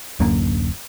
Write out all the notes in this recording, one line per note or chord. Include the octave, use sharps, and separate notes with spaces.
D1 F#2 D3 A#3